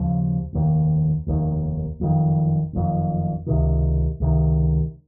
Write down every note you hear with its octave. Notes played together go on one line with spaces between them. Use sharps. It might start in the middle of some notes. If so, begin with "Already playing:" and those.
Already playing: D#2 C#3 F3
F1 D#2 D#3
F1 D#2 D#3
F#1 F2 D#3
F#1 F2 D#3
C#2 C3 D#3
C#2 C3 D#3